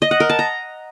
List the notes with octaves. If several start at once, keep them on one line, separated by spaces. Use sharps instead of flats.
D#5
F#5
A#4
A5
A#5